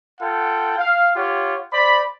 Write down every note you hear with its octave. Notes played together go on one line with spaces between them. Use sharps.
F4 A4 F#5 G5
F5
F4 G4 C#5 F#5
C5 D5 B5